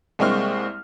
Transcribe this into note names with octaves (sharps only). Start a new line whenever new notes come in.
C2 G#3 A#3 C4 C#6 F6